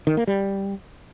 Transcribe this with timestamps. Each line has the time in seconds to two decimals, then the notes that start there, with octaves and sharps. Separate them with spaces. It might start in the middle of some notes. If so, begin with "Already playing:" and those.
0.07 D#3
0.17 A#3
0.27 G3